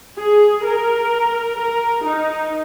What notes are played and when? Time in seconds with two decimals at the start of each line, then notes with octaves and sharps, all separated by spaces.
0.18 G#4
0.66 A#4
1.59 A#4
2.06 D#4